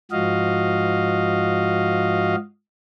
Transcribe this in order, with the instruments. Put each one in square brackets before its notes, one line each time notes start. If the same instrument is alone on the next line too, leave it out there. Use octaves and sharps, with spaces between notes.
[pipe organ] G#2 F3 F#4 D#5 F5